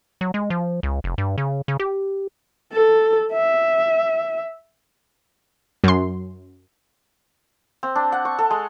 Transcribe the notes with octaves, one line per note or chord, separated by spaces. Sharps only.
F#3
G#3
F3
C#2
F1
G2
C#3
C#3
G4
A4
E5
F#2 C6
C4
D4
F#5
C#6
A4
G#3